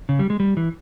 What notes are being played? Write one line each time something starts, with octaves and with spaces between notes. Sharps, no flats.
C#3
G3
G#3
G3
E3